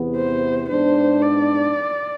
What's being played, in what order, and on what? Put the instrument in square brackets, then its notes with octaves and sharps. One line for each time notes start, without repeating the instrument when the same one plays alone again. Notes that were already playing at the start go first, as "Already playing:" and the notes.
Already playing: [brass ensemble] E2 C3 E3 B3
[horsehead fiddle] C5
[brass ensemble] G#2 G#3 B3 D4 [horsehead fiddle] C5
[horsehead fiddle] D5